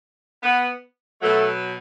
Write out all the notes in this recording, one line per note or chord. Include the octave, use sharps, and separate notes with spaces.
B3
B2 F#3 A3